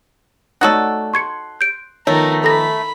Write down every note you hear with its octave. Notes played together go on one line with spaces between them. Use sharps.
A3 D#4 F#4 A4 C#5 D5 F#5 F#6
C6 C#6 G#6 C#7
G6 D7
D#3 F3 A3 B3 D#4 A#4 C#5
A4 A#5 B5 A#6